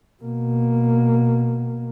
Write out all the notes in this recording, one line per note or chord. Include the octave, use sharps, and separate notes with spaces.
B2 A#3